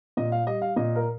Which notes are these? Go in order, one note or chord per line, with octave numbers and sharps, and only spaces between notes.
A#2 D#5
F5
G3 D#5
F5
A#2 D#5
A#4